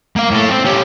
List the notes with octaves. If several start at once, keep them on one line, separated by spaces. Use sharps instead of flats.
A#3 F5
A2 A4
C4
C#4 G4